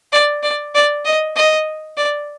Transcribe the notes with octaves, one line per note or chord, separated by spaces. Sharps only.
D5
D5
D5
D#5
D#5
D5